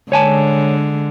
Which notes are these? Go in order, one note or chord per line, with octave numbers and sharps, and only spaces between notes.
D3 G#3 C#5 G#5 A5